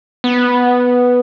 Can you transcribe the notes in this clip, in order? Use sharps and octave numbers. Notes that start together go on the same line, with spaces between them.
B3